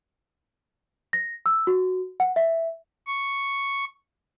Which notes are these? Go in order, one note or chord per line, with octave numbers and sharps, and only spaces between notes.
A#6
E6
F#4
F#5
E5
C#6